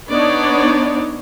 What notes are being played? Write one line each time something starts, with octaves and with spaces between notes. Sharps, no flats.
B3 D4 D#4 C#5 D5